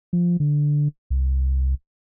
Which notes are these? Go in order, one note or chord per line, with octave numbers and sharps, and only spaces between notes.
F3
D3
C2